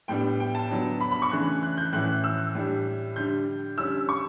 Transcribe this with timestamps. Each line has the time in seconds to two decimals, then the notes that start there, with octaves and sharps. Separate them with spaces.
0.08 A2 G3 B3 D4 G5
0.40 G5
0.55 A5
0.71 D3 F#3 B3 D4
1.01 B5
1.11 B5
1.22 C#6
1.31 C#3 E3 A3 D4 F#6
1.63 F#6
1.78 G6
1.93 A2 E3 A3 C#4 F#6
2.24 E6
2.55 A2 G3 D4
3.16 D3 G3 D4 G6
3.78 D3 G3 C#4 E6
4.09 C#6